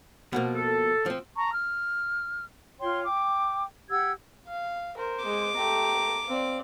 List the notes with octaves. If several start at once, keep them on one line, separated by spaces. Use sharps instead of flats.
B2 F3 A#3
A4
F3 C4
A5 A#5 C#6
F6
F4 C#5 G5 C6
G5 D6
G4 F#5 E6 G#6
F5
A#4 C5
G#3 D6
A3 G4 A#5
C4 D5 F5